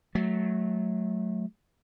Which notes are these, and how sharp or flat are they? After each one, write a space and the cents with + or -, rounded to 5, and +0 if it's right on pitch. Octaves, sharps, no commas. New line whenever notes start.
F#3 +0 A3 -20